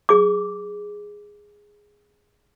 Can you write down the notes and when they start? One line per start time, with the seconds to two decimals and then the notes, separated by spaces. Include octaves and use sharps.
0.09 G#4 D6